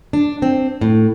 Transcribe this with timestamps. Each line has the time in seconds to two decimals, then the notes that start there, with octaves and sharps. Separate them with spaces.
0.13 D4
0.42 C4
0.81 A2